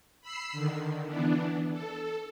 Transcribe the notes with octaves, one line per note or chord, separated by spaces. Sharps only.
B5 E6 C7
D3 D#3
E3 B3 D4
A4